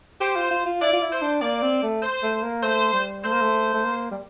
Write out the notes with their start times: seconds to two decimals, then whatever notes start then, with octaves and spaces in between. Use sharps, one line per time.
0.21 G4 C5
0.36 F4
0.51 F4
0.66 F4
0.81 E4 D5
0.93 F4
1.02 E4
1.12 C5
1.22 D4
1.42 A#3 D5
1.62 C4
1.83 A3
2.02 C5
2.23 A3
2.43 A#3
2.63 A3 C5
2.93 G3
3.24 A3 C5
3.33 A#3
3.41 A3
3.74 A3
3.85 A#3
4.11 G3